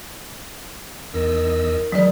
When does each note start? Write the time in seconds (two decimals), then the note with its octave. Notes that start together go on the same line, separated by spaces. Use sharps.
1.14 E2 D#3 D#5 E6
1.92 D#3 E3 F#3 G#3 D5